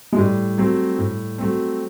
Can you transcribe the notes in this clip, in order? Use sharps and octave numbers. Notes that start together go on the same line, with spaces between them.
G#3
A2 G3
F#3 A3 C4
A2
F#3 A3 C4